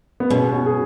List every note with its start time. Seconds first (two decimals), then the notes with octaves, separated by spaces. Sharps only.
0.20 B3
0.30 B2 G#3 C#4
0.52 C#4 F#4
0.66 G#4